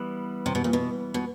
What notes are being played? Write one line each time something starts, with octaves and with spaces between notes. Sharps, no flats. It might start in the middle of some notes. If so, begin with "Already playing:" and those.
Already playing: E3 G3 B3
C3
B2
A#2
B2
B2